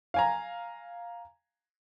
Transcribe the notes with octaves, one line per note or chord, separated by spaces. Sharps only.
F5 G#5 A#5